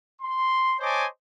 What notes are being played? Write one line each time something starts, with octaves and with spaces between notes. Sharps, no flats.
C6
C5 C#5 D#5 G#5 A5 D6